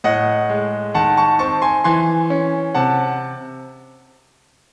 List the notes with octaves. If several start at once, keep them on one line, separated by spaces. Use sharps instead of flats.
A2 D#5 F#5
G#3
D#3 F#5 A5
A5 C#6
C4 A5 C#6
G#5 C6
E3 G#5 C6
C#4
C3 F#5 A5